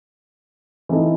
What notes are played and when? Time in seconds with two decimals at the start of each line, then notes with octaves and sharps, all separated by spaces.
0.89 E3 C4 D#4 A4